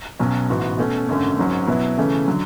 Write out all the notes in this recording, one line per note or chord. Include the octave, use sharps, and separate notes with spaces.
B1 B2 F#3 C#4
A1 G#2 E3 B3 F#4
B2 A3 C#4
G#1 F#2 D3 A3 C#4
G#1 G#2 F#3 C#4
B2 F#3 B3 E4
C#3 E3 A3 C#4
D3 F#3